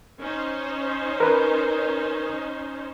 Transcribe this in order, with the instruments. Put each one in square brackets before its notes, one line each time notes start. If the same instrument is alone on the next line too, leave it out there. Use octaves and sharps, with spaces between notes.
[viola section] C#4 D#4 C5
[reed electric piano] A#4 B4